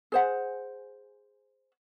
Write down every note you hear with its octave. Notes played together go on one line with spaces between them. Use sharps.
G#4 C5 F#5